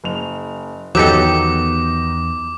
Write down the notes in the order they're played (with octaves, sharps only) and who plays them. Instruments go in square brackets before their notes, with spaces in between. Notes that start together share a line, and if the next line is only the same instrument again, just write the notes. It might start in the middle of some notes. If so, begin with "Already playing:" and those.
[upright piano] F#1 F7
[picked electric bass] E2 [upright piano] D#3 B3 D#4 [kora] F#3 G4 A4 [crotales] D6